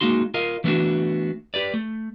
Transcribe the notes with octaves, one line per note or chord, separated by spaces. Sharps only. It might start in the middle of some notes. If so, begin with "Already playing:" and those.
G#3 A#3 D#4 F#4 C6
F4 A#4 D#5 F5
E3 A3 B3 C#4 D4 F#4
G4 B4 D5
A3